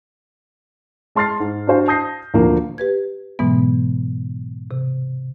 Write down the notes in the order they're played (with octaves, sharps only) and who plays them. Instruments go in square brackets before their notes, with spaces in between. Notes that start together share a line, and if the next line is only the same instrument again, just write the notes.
[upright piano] G#3 A5 C6 F6 A6 C7
G#2
D4 F#4 C5 F5
A5 D#6 G6 A#6 C7
D2 A#2 F3 A#3
[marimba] G4 B4 G#6
G#2 B2 E3 F#3 G#3 B3
C3